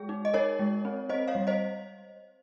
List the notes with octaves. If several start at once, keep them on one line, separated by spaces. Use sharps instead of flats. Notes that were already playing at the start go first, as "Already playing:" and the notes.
Already playing: G#3 G#4
D#4
D#5
D#4 A#4 C#5
G#3
C4
C4 C5 D#5
C#5 F5
G3
C5 D#5